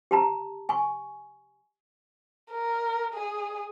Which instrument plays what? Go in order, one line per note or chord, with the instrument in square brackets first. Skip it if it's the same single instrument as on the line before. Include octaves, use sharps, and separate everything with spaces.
[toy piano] G4 A5 A#5
G#5 C#6
[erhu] A#4
G#4